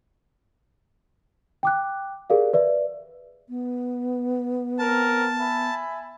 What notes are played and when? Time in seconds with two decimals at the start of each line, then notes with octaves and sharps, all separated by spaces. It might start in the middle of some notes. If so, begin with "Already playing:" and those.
1.63 G5 D6 F#6
2.30 G4 G#4 A#4 D5 F5
2.53 B4 D5 E5
3.49 B3
4.79 C4 A#4 A5
5.39 E5 G#5 B5